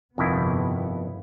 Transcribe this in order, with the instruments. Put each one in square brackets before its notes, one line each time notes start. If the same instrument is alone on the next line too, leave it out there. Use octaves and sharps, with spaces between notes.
[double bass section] G1 C3 B3 [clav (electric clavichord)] F2 D#3 E4